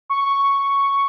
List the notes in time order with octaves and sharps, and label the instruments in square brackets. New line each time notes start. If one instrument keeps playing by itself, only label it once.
[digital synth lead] C#6